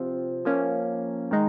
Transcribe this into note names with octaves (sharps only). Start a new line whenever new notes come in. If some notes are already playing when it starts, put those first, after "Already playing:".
Already playing: C3 F3 C4 F4
F3 A#3 C#4
D#3 G#3 D#4